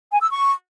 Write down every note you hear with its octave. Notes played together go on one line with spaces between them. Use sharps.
G#5
E6
C#6